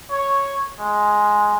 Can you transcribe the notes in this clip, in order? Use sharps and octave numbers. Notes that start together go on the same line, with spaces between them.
C#5
G#3